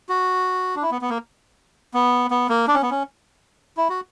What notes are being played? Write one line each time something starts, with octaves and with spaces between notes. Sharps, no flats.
F#4
D4
E4
B3
B3
A#3
B3
B3
A#3
D4
C#4
B3
C#4
E4
F#4